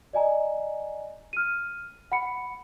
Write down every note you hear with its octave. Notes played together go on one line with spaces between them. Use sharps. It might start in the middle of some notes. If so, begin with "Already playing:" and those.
D5 D#5 G#5 A#5
F6 D#7
F#5 B5 C#7